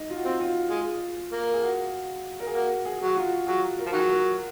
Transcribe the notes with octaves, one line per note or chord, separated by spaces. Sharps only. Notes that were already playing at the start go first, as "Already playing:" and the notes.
Already playing: D#4
F4
F#4
C4 F4
F4
G#3
A#3
G#4
F#4
A#4
G#4
A#3 F#4
G#4
F#3 G#4
F#4
F4
F#3 G#4
A#4
F3
D#3 F#3
G#4
A#4